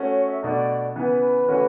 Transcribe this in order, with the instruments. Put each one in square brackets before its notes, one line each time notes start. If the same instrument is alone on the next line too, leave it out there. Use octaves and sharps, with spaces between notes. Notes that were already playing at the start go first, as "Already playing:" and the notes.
Already playing: [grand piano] A3 C#4 F#4
[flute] C#5
E5
[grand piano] B2 A3 D4 [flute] D5
[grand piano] C#3 E3 B3 [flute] B4
[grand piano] C#3 E3 A3 C#4 F#4